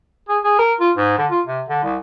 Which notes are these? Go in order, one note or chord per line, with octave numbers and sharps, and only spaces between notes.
G#4
G#4
A#4
F4
G#2
D3
F4
C3
D3
C2